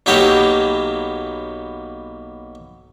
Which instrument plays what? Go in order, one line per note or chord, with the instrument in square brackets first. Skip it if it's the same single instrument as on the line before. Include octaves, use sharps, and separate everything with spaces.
[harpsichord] B1 F#3 A#3 B3 G4 C#5